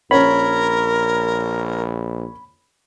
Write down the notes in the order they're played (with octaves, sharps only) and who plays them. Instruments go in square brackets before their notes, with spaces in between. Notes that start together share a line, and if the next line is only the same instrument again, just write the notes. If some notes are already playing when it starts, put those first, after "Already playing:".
[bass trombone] A#1 [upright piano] C#4 [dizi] A#4 [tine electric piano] B5